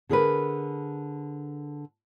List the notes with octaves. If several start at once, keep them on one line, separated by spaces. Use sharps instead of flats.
D3 G#4 A#4 B4